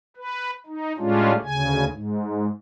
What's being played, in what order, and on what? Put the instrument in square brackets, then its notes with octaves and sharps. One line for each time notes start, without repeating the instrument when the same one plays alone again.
[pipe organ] B4
D#4
A2 G3 G#3 C#4 D4 F4
D2 C#3 G#5
G#2